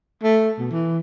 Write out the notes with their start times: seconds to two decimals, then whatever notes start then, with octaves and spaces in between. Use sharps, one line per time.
0.23 A3
0.58 B2
0.71 E3